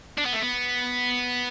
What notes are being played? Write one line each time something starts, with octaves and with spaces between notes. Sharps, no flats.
D4
B3
A3
B3